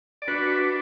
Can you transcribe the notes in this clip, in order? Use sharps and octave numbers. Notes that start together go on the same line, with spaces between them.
D5
D4 F#4 B4